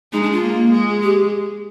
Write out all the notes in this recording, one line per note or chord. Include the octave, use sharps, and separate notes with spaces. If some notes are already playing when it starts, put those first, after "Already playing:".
G#3 D#4
D4
F4
A#3
G#3
G4